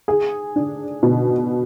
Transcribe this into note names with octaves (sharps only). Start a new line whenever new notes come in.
G#4
D4
B2